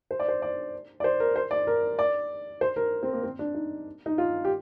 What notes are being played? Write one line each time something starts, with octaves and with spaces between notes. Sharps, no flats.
C5
D5
C5
D5
D5
C5
A#4
C5
D5
A#4
D5
C5
A#4
C4
A#3
C4
D4
D#4
D#4
F4
G4